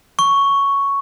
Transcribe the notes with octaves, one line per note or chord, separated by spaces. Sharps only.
C#6